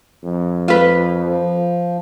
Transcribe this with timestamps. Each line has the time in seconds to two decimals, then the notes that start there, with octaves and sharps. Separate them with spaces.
0.24 F2
0.68 F4 B4
1.16 F3